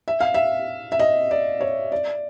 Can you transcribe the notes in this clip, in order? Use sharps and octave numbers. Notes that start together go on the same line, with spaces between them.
E5
F5
E5
E5
D#5
D5
C#5
D5